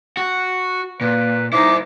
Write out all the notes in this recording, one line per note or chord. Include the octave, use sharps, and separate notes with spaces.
F#4
A#2 B4
D#4 E4 C5 D6